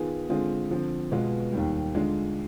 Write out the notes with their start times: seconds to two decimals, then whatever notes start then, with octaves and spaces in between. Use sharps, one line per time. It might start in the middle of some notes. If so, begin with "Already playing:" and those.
Already playing: D#3 B3 F4 G#4
0.29 D3 G#3 C4 F4 G#4
0.70 D3 F3 C4
1.12 B2 G#3 B3 F4
1.53 D#2 D#3 G3
1.94 D3 G#3 D4 F4